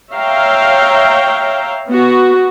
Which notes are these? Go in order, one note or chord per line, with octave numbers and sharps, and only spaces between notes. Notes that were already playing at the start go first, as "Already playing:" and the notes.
C#5 E5 F5 G5 A#5
B3 F#4